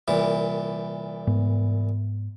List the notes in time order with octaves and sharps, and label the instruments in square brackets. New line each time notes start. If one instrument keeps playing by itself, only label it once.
[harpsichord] C2 A#2 E3
[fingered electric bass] G#2 B3